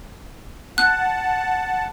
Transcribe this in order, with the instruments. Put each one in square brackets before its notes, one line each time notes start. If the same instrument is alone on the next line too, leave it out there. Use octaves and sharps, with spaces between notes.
[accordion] F#5 A5 [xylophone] F#6